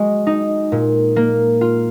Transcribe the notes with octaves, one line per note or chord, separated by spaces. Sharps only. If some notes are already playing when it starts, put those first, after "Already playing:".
Already playing: G#3 F#4
D#4
A#2
A#3
F4